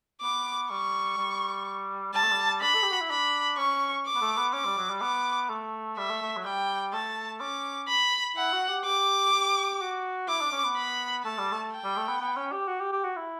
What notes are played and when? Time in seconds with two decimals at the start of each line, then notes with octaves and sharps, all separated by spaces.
0.21 B3 D6
0.70 G3 C#6
1.17 G3
2.13 G3 A5
2.23 A3
2.31 G3
2.62 D4 B5
2.74 A4
2.83 G4
2.92 F#4
3.01 E4
3.10 D4 B5
3.57 C#4 C#6
4.06 D6
4.15 B3
4.21 A3
4.37 B3
4.53 C#4 D6
4.65 G3
4.77 F#3
4.90 G3
5.01 B3 D6
5.49 A3
5.97 G3 E5
6.09 A3
6.22 A3
6.37 F#3
6.44 G3 G5
6.93 A3 A5
7.40 C#4 D6
7.88 B5
8.36 E4 F#5
8.52 F#4
8.69 G4
8.84 G4 D6
9.33 G4
9.81 F#4
10.28 E4 D6
10.41 D4
10.52 C#4
10.64 B3
10.77 B5
11.24 A3 A5
11.38 G3
11.52 A3
11.72 G5
11.84 G3
11.97 A3
12.08 B3
12.20 B3
12.36 C#4
12.52 G4
12.68 F#4
12.80 G4
12.92 G4
13.04 F#4
13.16 E4